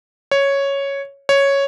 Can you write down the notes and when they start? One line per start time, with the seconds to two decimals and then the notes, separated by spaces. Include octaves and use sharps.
0.31 C#5
1.29 C#5